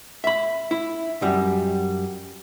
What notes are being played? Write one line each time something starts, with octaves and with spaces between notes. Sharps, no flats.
E5 B5
E4
F#2 G3